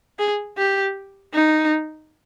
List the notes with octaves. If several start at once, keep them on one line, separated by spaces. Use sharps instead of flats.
G#4
G4
D#4